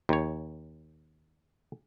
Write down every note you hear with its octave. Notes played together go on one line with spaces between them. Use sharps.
D#2 C#5